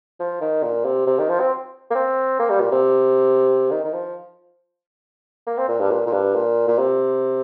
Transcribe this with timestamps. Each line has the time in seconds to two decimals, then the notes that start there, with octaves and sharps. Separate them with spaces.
0.20 F3
0.41 D#3
0.63 A#2
0.85 C3
1.07 C3
1.19 D#3
1.29 F3
1.40 C4
1.90 A#3
1.95 C4
2.39 A#3
2.50 G3
2.61 A#2
2.72 C3
3.71 D#3
3.85 D#3
3.93 F3
5.47 A#3
5.58 C4
5.68 A#2
5.80 G2
5.91 A#2
6.07 A#2
6.12 G2
6.35 A#2
6.68 A#2
6.79 C3